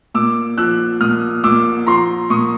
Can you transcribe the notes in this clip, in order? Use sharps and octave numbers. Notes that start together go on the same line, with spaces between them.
A#2 D6 E6
F3 E6 F#6
A#2 D#6 F6
A#2 D6 E6
F3 A#5 C6
A#2 C#6 D#6